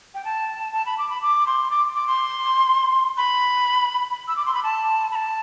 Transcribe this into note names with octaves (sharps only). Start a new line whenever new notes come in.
G5
A5
A5
B5
D6
B5
D6
C6
D6
D6
C6
B5
E6
D6
C6
B5
A5
B5
A5